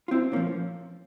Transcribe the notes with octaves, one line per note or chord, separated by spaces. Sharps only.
F4
C4 E4
A#2 F3 A#3 C#4